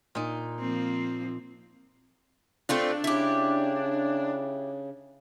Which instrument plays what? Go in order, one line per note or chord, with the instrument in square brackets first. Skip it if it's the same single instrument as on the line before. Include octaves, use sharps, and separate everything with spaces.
[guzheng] A#2 D#4
[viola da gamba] F3 A#3 C4
[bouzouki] A3 C4 F4 [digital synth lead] D4
[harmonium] C#3 [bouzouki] E4 G4